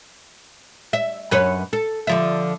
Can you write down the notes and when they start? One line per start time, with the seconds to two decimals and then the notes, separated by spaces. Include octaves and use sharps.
0.93 E5
1.31 F#2 B4 C#5
1.73 A4
2.07 D3 F3 E5